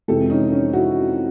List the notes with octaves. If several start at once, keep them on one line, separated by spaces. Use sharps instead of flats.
F2 C3 E3 G#3 G4 A4
C#4 D#4
C#4
E4 F#4